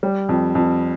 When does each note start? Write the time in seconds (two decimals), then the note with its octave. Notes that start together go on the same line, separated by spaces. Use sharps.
0.03 G3
0.29 F2
0.55 F2